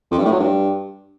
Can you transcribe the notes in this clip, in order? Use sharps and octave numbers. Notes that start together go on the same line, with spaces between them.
F2
G2
A2
F#3
G2